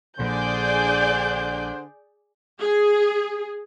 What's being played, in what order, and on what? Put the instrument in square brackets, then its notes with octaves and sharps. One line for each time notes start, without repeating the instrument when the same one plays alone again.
[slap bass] A#1 A#2 [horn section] D3 D4 C5 [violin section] G#4 D5 G6
[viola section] G#4